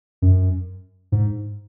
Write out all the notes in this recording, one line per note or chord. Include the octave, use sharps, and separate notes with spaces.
F#2
G#2